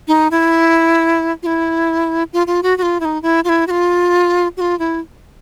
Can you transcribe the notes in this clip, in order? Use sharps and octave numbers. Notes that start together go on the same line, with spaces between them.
D#4
E4
F4
E4
F4
F4
F#4
F#4
F4
E4
D#4
E4
F4
E4
F#4
F4
F#4
F4
E4